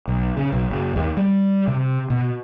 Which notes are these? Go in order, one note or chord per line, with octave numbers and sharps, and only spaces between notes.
B1
C#3
B1
F#1
D#2
G3
C3
B2